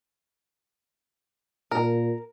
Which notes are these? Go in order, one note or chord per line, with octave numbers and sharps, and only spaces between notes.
A#2 A#4